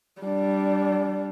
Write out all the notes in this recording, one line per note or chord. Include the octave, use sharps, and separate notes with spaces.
G3 D4